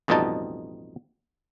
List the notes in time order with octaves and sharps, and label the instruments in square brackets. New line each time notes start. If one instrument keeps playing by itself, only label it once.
[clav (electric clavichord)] A1 F2 B2 G3 D#4 A5